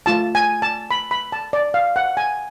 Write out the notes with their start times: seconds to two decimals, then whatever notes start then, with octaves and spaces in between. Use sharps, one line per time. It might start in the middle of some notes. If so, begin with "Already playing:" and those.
0.06 A3 F4 A5
0.35 G#5
0.62 A5
0.91 B5
1.11 B5
1.32 A5
1.53 D5
1.74 F5
1.96 F#5
2.17 G#5